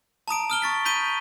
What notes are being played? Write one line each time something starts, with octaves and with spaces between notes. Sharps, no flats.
A5 A#5 D#6 D7
D#6 F6 G7
C#6 A6 B6
B5 G6 B6 D#7 G7